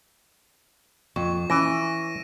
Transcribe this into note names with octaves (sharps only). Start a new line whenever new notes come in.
F2 C#6
E3 C#4 A#6 D7 D#7